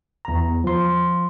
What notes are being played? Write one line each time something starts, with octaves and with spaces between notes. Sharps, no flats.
E2 A#5
F3 C6